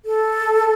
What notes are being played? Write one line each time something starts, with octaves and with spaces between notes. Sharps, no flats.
A4